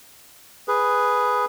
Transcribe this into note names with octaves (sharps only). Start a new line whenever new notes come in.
G#4 B4